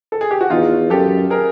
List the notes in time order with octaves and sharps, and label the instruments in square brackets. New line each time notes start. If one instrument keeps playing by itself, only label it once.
[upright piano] A4
G#4
G4
F#4
[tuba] E2 [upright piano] D#4 F4
[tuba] F#2 [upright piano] G4 A4
[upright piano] G#4 A#4